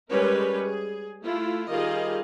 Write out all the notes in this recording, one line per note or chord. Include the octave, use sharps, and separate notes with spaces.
G3 G#3 C#4 A#4 B4 C#5
G#4
A3 E4 F4
D#3 G3 F4 G#4 D#5 F5